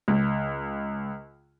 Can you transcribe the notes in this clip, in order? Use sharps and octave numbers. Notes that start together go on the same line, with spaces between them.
C#2